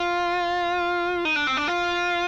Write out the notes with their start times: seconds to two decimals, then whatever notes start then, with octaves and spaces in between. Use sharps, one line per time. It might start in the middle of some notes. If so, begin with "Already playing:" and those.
Already playing: F4
1.25 D#4
1.36 D4
1.47 C4
1.57 D4
1.68 F4